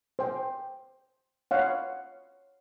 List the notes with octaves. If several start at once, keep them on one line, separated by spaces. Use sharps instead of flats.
C5 G5
C#5 F5 F#5